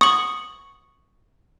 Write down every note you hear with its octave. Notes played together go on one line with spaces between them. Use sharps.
C#6 D#6 F#7